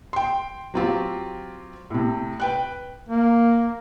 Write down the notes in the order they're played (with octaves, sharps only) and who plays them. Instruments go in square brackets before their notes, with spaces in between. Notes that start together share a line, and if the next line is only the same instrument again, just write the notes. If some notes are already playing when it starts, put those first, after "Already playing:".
[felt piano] G5 C6
F#3 C4 F4 G4
A2 C3
B4 G5 F#6
[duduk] A#3